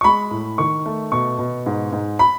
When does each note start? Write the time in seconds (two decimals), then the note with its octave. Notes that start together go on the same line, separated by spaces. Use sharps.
0.01 C#6
0.04 G#3 B5
0.31 A2
0.58 D#3 C#6
0.86 A3
1.12 B2 C#6
1.39 B2
1.66 G#2
1.93 G#2
2.19 B5